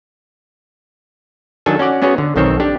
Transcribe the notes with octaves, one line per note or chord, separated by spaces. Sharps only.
D#3 F#3 D4 A4 G#5 A5
C#4 F#4 D5 F#5
B3 C#4 F#4 G#4 C#5
D3
B1 D#3 C4 A4 C#5
D4 G4